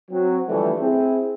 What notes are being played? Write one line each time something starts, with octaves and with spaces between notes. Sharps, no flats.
F#3 C4
D3 E3 F3 G3 A3
C4 E4 G#4